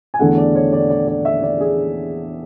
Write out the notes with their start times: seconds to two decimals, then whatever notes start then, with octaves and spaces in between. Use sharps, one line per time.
0.14 G#5
0.19 E2 D3 A3 F#5
0.37 D5
0.55 C#5
0.73 D5
0.90 D5
1.07 D5
1.25 E5
1.43 D5
1.60 G#4